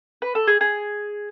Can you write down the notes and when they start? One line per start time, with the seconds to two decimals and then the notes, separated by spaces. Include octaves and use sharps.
0.22 B4
0.35 A4
0.47 G#4
0.61 G#4